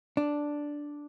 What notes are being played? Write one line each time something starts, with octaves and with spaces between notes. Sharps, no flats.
D4